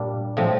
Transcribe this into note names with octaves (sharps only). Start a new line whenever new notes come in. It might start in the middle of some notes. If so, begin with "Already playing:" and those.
Already playing: A#2 G3 D4
A2 F3 C4